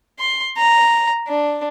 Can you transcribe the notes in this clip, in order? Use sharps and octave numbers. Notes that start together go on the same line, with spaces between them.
C6
A#5
D4